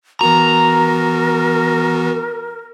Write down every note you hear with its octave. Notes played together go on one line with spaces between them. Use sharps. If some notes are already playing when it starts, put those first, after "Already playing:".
E3 B3 F#4 A#4 A#5